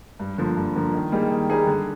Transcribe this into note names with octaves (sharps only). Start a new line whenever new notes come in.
G2
D3 F3 A#3
G2
D3 F3 A#3
D#3
G3 A#3 D#4 G#4
D#3
G3 A#3 D#4 G#4
D3